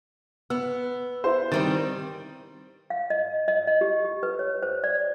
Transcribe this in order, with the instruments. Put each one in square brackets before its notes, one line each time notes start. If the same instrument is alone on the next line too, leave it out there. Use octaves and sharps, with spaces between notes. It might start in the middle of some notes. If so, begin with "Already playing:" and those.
[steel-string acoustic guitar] B3 [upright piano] E6
[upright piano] E4 C5
[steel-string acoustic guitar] D#3 G3 C4 [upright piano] A6
[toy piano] F5
D#5
D#5
D#5
G4
G4
B4
C#5
C5
D5